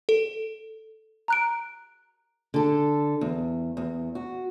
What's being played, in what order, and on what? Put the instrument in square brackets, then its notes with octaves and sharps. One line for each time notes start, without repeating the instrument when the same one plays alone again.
[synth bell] A4
[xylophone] A#5 F#6 D7
[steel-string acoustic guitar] D3 A4
E2
E2
F#4